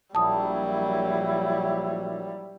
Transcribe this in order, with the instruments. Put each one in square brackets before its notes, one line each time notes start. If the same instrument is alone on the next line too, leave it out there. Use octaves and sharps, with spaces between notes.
[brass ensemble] A#1 F#3 [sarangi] G3 [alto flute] E4 [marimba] A5 D#6